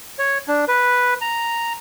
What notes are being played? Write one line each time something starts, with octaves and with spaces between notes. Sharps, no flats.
C#5
D4
B4
A#5